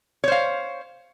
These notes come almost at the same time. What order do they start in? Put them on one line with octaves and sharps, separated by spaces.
C#5 C5 F5